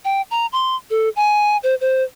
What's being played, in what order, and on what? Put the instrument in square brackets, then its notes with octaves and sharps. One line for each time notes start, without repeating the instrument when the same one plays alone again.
[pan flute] G5
A#5
C6
A4
G#5
C5
C5